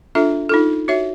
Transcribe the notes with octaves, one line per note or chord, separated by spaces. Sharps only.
D4 F4 A4 E5
D#4 F4 A4
F#4 C#5 E5